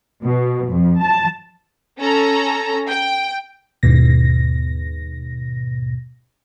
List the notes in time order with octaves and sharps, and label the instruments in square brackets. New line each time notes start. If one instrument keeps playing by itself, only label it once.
[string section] B2
F2
A5
[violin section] C#4 A4 A#5
G5
[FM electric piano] D#2 G#2 B2 A#6